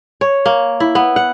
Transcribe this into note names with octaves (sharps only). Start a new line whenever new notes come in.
C#5
A#3
E4
B3
F#5